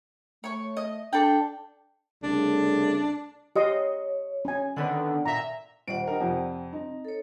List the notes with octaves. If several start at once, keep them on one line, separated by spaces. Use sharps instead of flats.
A3 C#5 C#6
D#5
D4 A4 D5 G5
C2 C#3 A3 D4
G4 C#5 D#5 C6
C#4 G#5
D3 D#3 B3 D5 F#5
A#2 E5 A#5
D#1 C5 D5 F#5 D7
D#4 G4 A#4
F2 C3
C4 D#4
A4 C#5